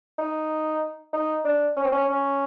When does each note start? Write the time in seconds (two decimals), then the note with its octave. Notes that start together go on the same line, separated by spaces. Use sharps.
0.18 D#4
1.13 D#4
1.45 D4
1.77 C#4
1.85 C4
1.92 C#4
2.09 C#4